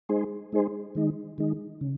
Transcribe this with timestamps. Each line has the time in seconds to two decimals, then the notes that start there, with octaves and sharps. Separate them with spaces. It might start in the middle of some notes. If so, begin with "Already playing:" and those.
0.09 G#3 D#4 G#4 C5
0.52 G#3 D#4 G#4 C5
0.95 D#3 G#3 D#4
1.38 D#3 G#3 D#4
1.81 C#3